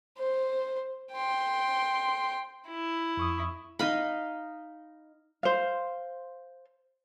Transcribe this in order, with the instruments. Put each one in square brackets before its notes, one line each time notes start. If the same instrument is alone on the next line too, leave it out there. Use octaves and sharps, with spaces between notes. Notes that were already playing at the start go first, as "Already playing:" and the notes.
[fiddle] C5
G5 C6
[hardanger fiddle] E4
[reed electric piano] F2 C#6 D#6
[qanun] D#4 D#5 F5 B5
[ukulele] C5 F5